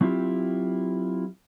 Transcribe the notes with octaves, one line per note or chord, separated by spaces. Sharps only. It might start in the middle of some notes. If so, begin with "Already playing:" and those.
F#3 C4 E4 F4 G4